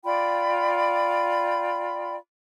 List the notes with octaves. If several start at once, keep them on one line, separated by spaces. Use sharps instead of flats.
F4 D5 G5 B5